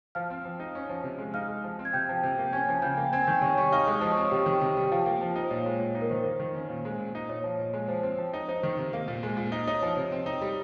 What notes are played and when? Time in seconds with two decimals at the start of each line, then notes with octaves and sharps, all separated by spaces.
0.15 F3 F5 F6
0.30 C4
0.45 F3
0.60 D#4
0.75 C#4
0.89 F3
1.04 C3
1.19 G#3
1.34 D#4 F5 F6
1.48 G#3
1.64 F3
1.79 C4
1.85 G#6
1.93 C3 G5 G6
2.09 F3
2.23 C3
2.38 A#3
2.53 C#4 G#5 G#6
2.68 F3
2.82 C#3 G5 G6
2.97 A#3
3.13 C4 G#5 G#6
3.27 D#3 G5 G6
3.42 C3 C#5 C#6
3.58 G3 C#5 C#6
3.72 D#4 F5 F6
3.87 G#3 D#5 D#6
4.01 F3
4.12 C#5 C#6
4.17 C4
4.31 C3 G4 G5
4.46 D#3
4.61 C3
4.77 G3
4.85 G5
4.91 F3 F4 F5
5.06 A#3
5.21 F3
5.31 D#4 C5
5.51 A#2 C#5
5.66 G#3
5.80 A#2
5.95 D#4
6.01 A#4
6.09 D#3 C5
6.24 A#3
6.40 D#3
6.55 C#4
6.70 A#2
6.85 G#3
6.99 A#2
7.15 D#4
7.29 A#2 C#5
7.44 F3
7.59 A#2
7.74 G#3
7.88 F3 C5
8.03 C4
8.18 F3
8.33 D#4
8.48 D#4 C5
8.63 D#3
8.78 C3
8.93 A#3
9.08 A#2
9.23 G#3
9.37 A#2
9.52 D#4
9.67 D#4 C#5
9.82 F3
9.97 C3
10.12 C4
10.26 D#4
10.42 G3